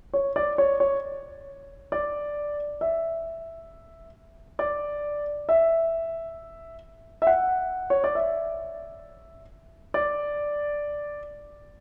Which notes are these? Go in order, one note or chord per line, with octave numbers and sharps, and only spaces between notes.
C#5
D5
C#5
C#5
D5
E5
D5
E5
E5
F#5
C#5
D5
E5
D5